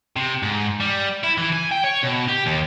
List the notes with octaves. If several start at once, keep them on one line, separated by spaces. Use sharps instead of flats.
C3
G#2
G3
E4
E3
G#5
G5
C#5
B2
G4
D#2